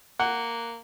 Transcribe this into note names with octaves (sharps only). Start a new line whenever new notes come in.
A#3 F#5